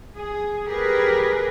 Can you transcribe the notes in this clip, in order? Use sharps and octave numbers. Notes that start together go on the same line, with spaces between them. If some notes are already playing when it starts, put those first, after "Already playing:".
G#4
G4 G#4 A#4 B4